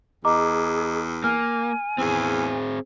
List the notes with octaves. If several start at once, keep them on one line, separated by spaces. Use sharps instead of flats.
E2 G#4 D#5 A#5 D6
A#3 G#5 F6
E2 C4 G#4